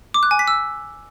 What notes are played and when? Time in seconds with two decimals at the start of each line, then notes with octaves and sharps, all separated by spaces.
0.14 D6
0.23 F#6
0.31 G#5
0.39 B6
0.48 E6